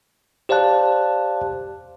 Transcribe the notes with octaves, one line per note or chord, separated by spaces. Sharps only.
G4 C5 D5 F5 A5 F#6